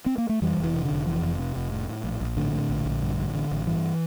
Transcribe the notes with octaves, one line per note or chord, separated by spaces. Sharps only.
C4
A#3
A3
F2 E3 G3
F1
E3
C3
D3
F1
F2 E3
F1
C3
F1
A2
A2
A#1
A#1
A2 D3
A2
A#1
A#1
G2
A1
D3
A1
G2 E3